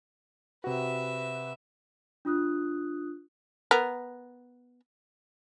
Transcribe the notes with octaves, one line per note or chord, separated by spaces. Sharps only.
C3 F#4 B4 E5
D4 F4 D#6 F#6
B3 A#4